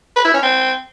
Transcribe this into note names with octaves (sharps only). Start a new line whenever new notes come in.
B4
E4
C#4
C4